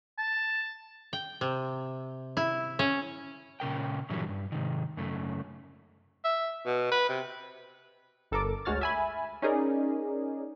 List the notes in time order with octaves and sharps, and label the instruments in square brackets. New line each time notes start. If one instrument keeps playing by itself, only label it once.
[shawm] A5
[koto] G5
C3
E4
C#4
[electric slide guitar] A#2 C#3 A#4 G5
G2 A#2 D3 E3 F#3 G3
G2
G#2 C3 D#3
F#2 C#3 A3
[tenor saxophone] E5
B2
B4
C3
[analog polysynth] G1 A4 A#4 D6
D2 G#3 F#4 C#5 F6 A6
E5 G#5 B5
C#4 D#4 G#4 A#4 D5